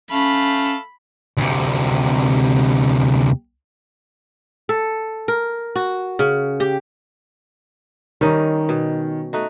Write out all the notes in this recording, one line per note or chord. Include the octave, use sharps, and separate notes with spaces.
A3 C#4 A4 F5 B5
D2 C3
A4
A#4
F#4
C#3
G4
D#3 G3 C#4 D#4
B2
A3 D#4 F#4